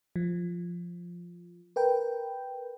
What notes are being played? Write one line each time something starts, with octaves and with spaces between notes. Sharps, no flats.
F3
A#4 B4 G5